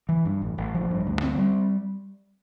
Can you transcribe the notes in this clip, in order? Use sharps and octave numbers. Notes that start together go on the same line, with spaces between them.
E3
G2
A1
A1
F3
G2
D2
C4
G3